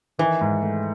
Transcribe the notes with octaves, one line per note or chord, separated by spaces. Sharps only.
D#3 E3
G#2
A3